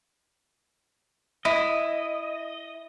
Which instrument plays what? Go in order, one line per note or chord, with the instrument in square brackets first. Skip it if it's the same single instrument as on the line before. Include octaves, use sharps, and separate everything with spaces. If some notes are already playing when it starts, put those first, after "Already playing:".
[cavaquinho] E4 [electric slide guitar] D#5